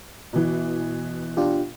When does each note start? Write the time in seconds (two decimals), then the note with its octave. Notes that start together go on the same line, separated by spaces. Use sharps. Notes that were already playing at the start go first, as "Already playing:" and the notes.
0.33 B2 E3
1.37 D4 F4 G4